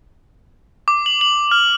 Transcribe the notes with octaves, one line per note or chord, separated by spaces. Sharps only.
D6
F#7
F#7
F6